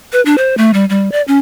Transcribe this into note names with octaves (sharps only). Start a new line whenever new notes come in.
B4
D4
C5
A3
G3
G3
D5
C#4